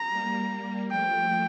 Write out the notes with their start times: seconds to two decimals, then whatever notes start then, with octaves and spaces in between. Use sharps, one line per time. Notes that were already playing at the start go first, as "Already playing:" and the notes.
Already playing: A#5
0.09 G3 A#3
0.90 F3 A3 G5